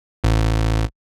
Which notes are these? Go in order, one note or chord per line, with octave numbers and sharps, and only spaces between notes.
A1